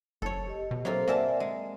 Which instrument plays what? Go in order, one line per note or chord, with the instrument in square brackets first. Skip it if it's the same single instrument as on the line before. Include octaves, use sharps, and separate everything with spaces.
[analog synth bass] F#1 [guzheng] A4 C#5
[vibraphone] G4 D#5
[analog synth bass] B2
[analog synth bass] F#3 [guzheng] A#3 C4 F4 [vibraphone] A4 C#5
[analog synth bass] A#3 [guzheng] A#4 E5 A5 [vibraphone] D5 F#5 G#5
[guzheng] G#3